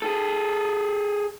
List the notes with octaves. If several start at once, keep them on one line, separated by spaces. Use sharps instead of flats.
G#4 A4